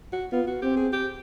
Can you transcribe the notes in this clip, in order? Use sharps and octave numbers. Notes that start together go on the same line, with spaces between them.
F#4
B3 F4
F#4
C4 G4
G#4
G4